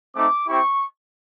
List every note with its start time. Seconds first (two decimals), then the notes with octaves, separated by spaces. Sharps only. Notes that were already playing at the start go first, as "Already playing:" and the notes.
0.14 A3 C4 D#4 D6
0.48 C4 E4 G4 C#6